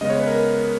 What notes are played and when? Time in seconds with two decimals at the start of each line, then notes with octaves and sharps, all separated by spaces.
0.01 C#3 G#3 B3 D#5
0.10 C#5
0.19 B4
0.27 A#4